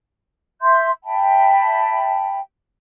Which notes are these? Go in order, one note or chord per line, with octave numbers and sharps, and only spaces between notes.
E5 C6 G6
E5 G5 A5 B5